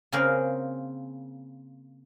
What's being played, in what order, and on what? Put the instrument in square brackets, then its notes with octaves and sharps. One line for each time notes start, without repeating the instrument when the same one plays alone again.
[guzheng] C#3 A#3 C4 G#4 A#4